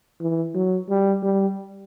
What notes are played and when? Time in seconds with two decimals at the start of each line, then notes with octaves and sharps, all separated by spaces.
0.20 E3
0.55 F#3
0.89 G3
1.23 G3